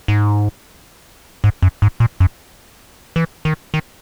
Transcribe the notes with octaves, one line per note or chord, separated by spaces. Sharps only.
G#2
G#2
F#2
G#2
A#2
F#2
E3
D#3
D#3